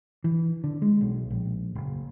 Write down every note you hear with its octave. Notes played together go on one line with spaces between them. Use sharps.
E3
D3
G#3
B1
A#1
F#1